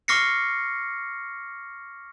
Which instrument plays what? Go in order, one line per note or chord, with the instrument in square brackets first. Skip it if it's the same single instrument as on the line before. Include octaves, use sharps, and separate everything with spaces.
[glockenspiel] C#6 D6 F6 A#6 C7 C#7